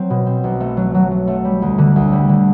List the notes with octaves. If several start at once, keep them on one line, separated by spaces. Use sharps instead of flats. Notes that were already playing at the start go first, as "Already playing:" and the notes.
Already playing: F#3 C4
B2
C4
B1
A3
F#3
F#3
F#3
A3
G3
D2
D3
D2
G3
D3